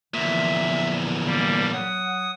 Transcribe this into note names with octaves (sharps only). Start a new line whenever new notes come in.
E2 A#2 D3 E3 F3 E5
G3 A#3
F#3 C#5 F#5 D#6